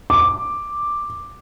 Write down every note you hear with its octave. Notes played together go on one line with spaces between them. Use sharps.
D6